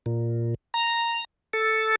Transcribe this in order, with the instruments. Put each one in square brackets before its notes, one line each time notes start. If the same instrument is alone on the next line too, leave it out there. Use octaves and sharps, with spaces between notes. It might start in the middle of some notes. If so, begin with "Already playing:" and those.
[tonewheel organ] A#2
A#5
A4